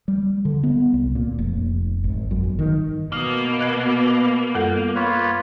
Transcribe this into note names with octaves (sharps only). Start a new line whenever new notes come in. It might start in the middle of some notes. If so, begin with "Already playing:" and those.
G3
D3
B3
C2
A#2
F1
G#1
F#2
G1
D#3
B2 A#3 D#6 F6
D#5 F#6 G#6
F#2 G3 A4
F4 B4 C#5